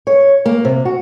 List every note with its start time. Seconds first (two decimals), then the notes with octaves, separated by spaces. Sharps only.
0.07 C#5
0.46 A#3
0.65 C3
0.85 F#4